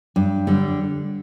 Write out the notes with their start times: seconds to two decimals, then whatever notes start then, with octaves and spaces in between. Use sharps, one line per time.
0.16 G2
0.47 D3 G3